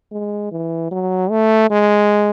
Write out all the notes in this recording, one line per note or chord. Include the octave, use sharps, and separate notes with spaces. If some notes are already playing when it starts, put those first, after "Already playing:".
G#3
E3
F#3
A3
G#3